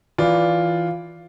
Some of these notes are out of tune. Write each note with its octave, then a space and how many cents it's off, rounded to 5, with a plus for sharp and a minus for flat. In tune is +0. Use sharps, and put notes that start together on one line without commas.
E3 +0 F4 +0 D5 -10